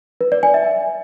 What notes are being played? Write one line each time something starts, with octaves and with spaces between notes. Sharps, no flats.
B4
D5
G#5
E5